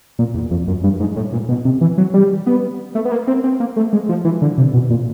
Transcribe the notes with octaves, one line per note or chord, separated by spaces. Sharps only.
A#2
E2
F2
F#2
G2
G#2
A2
A#2
B2
C3
E3
F#3
G3
B3
A3
B3
A#3
C4
C4
A#3
A3
G#3
F3
E3
D3
C3
B2
A#2